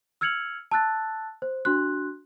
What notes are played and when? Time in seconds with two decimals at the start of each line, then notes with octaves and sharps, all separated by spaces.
0.21 E6 F6 G#6 C#7 F7 F#7
0.71 A5 E6 F#6 A6
1.42 C5
1.65 D4 F#4 C6 F#6